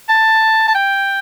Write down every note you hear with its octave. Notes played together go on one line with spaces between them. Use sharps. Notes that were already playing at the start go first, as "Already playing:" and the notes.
A5
A5
G5